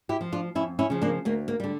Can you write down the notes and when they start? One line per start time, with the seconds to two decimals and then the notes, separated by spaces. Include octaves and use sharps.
0.09 E4 G4
0.21 F3
0.32 D4 F4
0.55 F2 C#4 E4
0.79 C#4 E4
0.90 C#3 F3
1.02 A#3 D4
1.25 D2 A#3
1.48 A#3
1.60 D3 G3